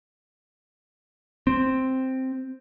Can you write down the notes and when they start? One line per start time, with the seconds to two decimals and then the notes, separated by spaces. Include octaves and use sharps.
1.47 C4